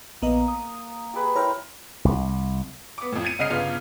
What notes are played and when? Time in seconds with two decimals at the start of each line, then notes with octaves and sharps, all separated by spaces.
0.22 A#1 A#3 B3 D#5
0.48 D#6
1.13 G4 G#4 B4
1.36 E4 A#4 C5 C#5 G5
2.05 C2
2.98 B3 D6
3.12 F2 A2
3.24 G#6 A6 C#7 D#7
3.39 C2 C#3 D#5 F6 C7 D#7
3.50 G1 C#3 B3 F4 F6